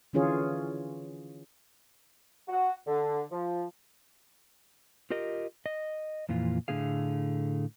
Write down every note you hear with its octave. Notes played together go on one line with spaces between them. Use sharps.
D3 E3 C#4 F4 G#4 C#5
F#4
D3
F3
F4 G4 A#4 D#5
D#5
F2 A#2 E3 F4
A2 D3 A3 G#4 F5